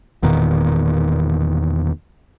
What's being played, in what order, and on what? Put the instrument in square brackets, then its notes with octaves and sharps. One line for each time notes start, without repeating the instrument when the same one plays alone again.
[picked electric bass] E1 E2 A#2 D#3